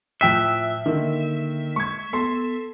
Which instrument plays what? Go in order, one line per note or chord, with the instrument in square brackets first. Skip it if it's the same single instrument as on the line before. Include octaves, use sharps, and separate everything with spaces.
[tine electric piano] A2 F6 F#6 [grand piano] F3 G5 B6 [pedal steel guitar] E5
[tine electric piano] D3 A#3 [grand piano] D#3
[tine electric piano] G#3 [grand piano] C#6 G#6
[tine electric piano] B3 [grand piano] A4 C6